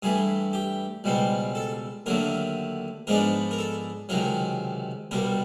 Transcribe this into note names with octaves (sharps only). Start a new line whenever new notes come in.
G2 E3 A3 G#4
G4
C#2 B2 G3 C4
A4
D#2 D3 F#3 A3 A#4
G#2 F3 G#3 B3 D4 A#4
A#4
A4
C#2 C3 D#3 F#3 A#4
C2 B2 G3 A#4